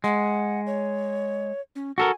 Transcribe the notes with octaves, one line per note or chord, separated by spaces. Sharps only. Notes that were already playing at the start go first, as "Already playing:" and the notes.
G#3 F#5
C#5
C#4
F#4 A4 A#4 G#5